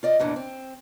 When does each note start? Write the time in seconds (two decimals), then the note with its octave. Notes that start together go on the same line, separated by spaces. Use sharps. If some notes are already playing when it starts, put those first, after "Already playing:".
0.03 F4 D5 D#5
0.19 E2 A#2 E3 D4
0.36 C4